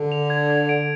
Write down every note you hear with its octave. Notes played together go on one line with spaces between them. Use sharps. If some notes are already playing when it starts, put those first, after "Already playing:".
Already playing: D3
F7
G#6
G#6
D7